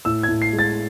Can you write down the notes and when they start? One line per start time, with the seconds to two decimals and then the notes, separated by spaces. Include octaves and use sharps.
0.05 A2 E6
0.23 G#6
0.29 A2
0.42 C7
0.53 G#3
0.59 A6